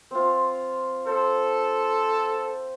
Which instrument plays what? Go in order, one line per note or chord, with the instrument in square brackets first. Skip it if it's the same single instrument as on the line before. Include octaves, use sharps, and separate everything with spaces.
[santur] C4 F4
[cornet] A4 [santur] C5